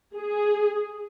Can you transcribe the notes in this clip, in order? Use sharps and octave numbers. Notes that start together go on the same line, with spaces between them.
G#4